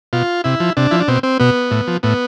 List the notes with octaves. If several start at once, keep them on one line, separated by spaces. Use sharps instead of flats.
B2 F4
C3 E4
F3
C3 D4
F3 E4
D4
B2 C4
C4
B2 B3
A2
F3
A2 B3